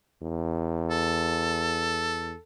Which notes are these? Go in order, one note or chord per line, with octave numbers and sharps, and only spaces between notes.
E2
A4